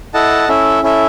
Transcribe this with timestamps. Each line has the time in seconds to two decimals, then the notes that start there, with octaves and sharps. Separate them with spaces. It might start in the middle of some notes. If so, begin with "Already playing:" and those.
0.14 E4 A4 D#5 F#5 A5
0.48 C#4 E4 A4 E5
0.83 C#4 E4 A4 E5